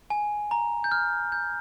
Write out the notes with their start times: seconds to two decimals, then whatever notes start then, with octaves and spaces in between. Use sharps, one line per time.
0.10 G#5
0.51 A#5
0.84 G6
0.92 F6
1.32 G6